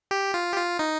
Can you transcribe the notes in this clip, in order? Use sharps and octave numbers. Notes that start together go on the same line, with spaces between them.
G4
F4
G4
F4
D#4